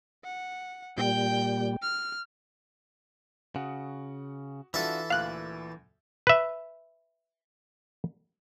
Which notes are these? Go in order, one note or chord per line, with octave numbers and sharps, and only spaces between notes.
F#5
A#2 G3 G5 G6
F6
C#3 F#4 F#5 D#6
E3 D4 F4 F#4 A4 E5
D2 A#2 F5 F#6
B4 E5